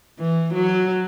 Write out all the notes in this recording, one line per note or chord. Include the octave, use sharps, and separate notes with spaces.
E3
F#3